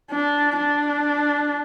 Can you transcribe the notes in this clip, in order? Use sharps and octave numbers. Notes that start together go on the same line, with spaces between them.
D4
D4